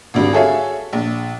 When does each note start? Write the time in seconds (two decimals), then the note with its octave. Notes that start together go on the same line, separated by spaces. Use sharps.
0.14 G#1 D2 G3
0.32 F#4 G#4 A4 C#5 E5 F5
0.93 A#1